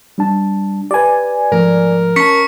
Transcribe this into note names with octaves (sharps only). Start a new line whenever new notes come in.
G3 D4 A5
G4 B4 D5 G#5
G#2 F3 A3 A#4
C#4 A5 C#6 B6 C#7